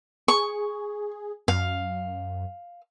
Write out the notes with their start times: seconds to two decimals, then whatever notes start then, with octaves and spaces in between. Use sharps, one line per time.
0.28 G#4 C#6
1.48 F#2 F5